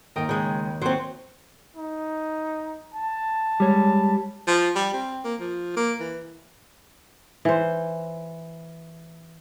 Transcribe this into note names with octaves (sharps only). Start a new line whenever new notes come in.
D#2 D#3 A#4 G5 D#6
C#3 G#3 G6
F#3 C4 C5 C6 C#6
D#4
A5
G3 G#3 C#5
F3
G3
C4
A#3
F3
A#3
E3
E3 C5